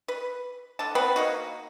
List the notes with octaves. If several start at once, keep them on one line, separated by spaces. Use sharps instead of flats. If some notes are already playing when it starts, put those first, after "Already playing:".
B4
D3 A5
B3 C4 B4
A#3 D#4 F#4